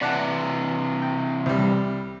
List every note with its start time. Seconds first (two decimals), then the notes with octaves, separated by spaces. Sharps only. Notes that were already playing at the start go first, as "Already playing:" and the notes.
0.01 C3 E3 D5 F#5 A5
1.02 G5
1.46 C2 G3